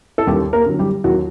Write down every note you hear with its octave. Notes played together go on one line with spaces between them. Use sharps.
A4
D#2 G3 G4
A#3 A#4
D3 F#3
G3 G4
D#2 F#3 F#4